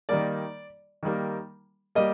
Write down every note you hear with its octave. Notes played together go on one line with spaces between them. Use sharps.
D#3 G3 A#3 D5
D#3 G3 A#3
G3 A#3 D#5